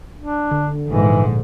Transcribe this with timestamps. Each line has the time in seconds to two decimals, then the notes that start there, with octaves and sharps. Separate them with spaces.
0.19 D4
0.51 D3
0.87 A#1 G#2 E3